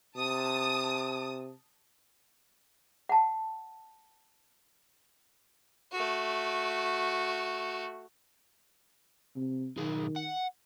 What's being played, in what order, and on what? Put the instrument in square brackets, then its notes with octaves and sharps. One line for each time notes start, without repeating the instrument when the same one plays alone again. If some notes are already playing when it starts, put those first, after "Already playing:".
[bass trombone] C3 [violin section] A5 D#6
[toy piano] F#5 A5
[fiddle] A3 F#4
[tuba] C3
[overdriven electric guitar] B1 G#4 [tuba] D#3
[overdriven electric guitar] F#5